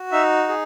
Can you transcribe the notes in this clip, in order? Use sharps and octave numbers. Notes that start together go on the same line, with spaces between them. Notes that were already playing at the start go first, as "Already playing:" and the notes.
Already playing: F#4
D#4 E5
G#4